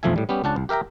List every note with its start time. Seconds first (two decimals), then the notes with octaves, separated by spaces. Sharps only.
0.03 B1 F2 F3 A3 E5 G#5
0.16 A2 G3
0.29 G3 B3 C#4 G4
0.44 C#2 C#4 D4 F#5 A5
0.56 C2
0.69 G4 A#4 E5 G5 A#5